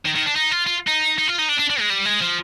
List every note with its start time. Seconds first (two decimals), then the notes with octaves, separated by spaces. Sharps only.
0.05 D#3
0.15 D#3
0.26 D4
0.36 D#4
0.51 F4
0.67 F4
0.87 D#4
1.19 D#4
1.28 F4
1.39 D#4
1.49 D4
1.59 D4
1.70 D4
1.80 G#3
1.90 G3
2.05 G#3
2.21 F3